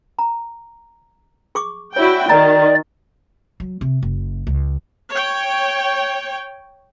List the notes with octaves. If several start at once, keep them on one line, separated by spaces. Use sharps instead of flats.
A#5
G#4 C#6 D6
E4 F#4 C#5 D5 G5
D#3 D5 A#5
F#3
C3
F#1
C#2
C#5 G5